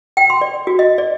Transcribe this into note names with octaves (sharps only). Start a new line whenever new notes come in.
G5
C6
D5
F#4
D#5
D5